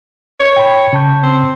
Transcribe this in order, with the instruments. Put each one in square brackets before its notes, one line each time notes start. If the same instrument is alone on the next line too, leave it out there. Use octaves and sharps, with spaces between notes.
[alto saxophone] C#5
[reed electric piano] G5 B5
C#3 A5 G6
[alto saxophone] C4